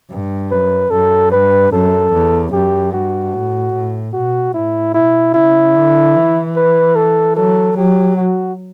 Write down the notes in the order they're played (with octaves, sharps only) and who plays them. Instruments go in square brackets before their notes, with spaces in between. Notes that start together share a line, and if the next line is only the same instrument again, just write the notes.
[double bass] G2
[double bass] F#2 [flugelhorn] B4
[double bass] F#2 [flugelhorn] A4
[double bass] G2 [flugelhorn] B4
[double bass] F#2 [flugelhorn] A4
[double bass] E2
[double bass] F#2 [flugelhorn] G4
[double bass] G2 [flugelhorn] F#4
[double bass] A2
A2
[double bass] B2 [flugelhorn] F#4
[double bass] A2 [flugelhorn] E4
[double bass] B2 [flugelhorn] E4
[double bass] C#3 [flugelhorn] E4
[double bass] D3
E3
[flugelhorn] B4
A4
[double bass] F#3 [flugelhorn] A4
[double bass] F#3 [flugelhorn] G4
[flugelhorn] F#4